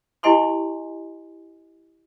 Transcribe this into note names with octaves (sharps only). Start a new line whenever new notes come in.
E4 G4 D#5 G#5 C6 C#6